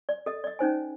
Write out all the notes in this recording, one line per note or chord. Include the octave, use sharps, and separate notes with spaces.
D5
A4 D#5
D5 D#5
C#4 D#4 C5 G#5